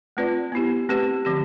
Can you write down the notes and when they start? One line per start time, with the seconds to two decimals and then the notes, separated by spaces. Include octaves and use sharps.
0.17 A3 C4 F4 B4 D5
0.52 B3 E4 G4
0.89 A3 C4 G4 B4
1.25 D3 F3 C4 G4